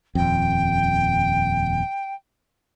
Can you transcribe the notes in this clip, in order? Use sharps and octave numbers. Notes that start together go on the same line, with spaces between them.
D#1 F2 G5